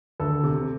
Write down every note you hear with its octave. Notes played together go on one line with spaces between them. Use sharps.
D2 A4
C3